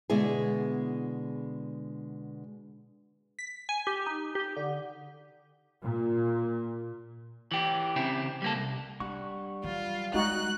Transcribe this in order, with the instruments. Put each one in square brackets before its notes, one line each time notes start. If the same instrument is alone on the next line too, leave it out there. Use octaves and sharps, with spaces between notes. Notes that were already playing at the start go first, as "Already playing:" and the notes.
[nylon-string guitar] B2 D3 G#3 B3 E4 G#4
[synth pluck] B6
G#5
G4
D#4
G4
D3
[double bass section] A#2
[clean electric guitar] E3 G4
C#3 C4 E4 G4
G3 A#3 A4
C2
[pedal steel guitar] G3 F#5 C#6 [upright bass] D4
[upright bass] E3 F#3 [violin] F4
[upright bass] G#3 [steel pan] D#4 F#4 [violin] F#6